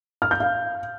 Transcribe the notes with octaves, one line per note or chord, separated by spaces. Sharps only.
F6
G6
F5